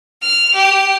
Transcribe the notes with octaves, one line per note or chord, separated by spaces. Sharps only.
F6
G4